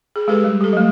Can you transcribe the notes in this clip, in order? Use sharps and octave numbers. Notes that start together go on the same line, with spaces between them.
G#4
G#3 G4 A4 B4
G3
G4 A4
F#3 A3